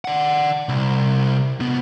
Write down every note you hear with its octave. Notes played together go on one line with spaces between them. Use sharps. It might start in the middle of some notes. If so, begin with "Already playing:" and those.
D5 F#5
C2
C3 B3